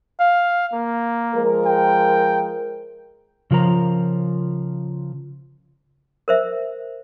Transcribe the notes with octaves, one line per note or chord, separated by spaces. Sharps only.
F5
A#3
F3 G#3 A#4
G5
C#3 F3 A#4 A#5
A#4 C5 E5